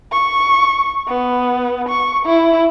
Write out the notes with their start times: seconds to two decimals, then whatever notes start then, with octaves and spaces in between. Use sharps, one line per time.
0.12 C#6
1.08 B3
1.89 C#6
2.25 E4